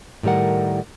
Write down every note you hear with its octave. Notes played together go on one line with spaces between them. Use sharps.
A2 D#3 G3 A#4 F#5